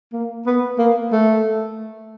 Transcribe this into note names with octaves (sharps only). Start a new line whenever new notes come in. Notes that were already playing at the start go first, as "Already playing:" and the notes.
A#3
B3
A#3
A3